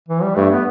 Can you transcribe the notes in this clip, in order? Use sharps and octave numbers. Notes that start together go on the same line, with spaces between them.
E3
G3
G2 A3
B3